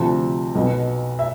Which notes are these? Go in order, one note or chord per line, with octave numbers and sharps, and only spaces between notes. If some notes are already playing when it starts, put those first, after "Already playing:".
Already playing: D2 C3 F3 A5
B1 B2 B3
E5